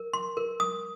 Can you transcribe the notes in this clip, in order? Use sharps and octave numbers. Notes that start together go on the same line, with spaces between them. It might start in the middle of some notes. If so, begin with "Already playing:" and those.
Already playing: A#4
C6
A#4
D#6